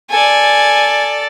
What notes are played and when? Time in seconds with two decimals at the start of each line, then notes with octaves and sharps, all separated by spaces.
0.10 A4 D5 G#5